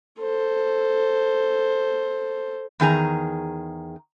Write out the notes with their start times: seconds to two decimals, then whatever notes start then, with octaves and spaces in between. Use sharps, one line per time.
0.19 A4 C5
2.80 E2 D#3 G#4 A#5